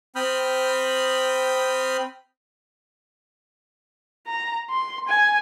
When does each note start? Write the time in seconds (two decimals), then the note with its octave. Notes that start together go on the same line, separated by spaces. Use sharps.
0.16 C4 B5 D#6 F6 G6
4.27 A#5
4.70 C6
5.08 G#5